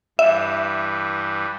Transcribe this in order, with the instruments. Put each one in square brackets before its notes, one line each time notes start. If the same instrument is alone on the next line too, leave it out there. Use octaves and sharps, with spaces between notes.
[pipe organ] G2 E3 [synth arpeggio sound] E5